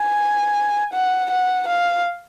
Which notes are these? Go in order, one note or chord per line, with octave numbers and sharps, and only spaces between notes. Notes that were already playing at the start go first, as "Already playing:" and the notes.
Already playing: G#5
F#5
F#5
F5